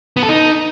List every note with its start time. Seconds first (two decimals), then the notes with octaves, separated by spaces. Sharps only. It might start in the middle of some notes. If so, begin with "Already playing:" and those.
0.17 B3
0.23 A4
0.29 D#4